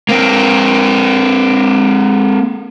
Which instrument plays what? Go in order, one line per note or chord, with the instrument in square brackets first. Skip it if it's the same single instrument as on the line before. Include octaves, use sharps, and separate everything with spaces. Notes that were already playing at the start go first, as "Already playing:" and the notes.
[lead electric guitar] A#3 C4